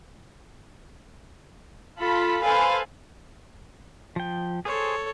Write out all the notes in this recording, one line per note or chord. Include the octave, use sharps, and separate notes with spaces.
F4 A4 B5
A4 B4 C5 F5 G#5
F3 G5
G#4 A4 C5 C#5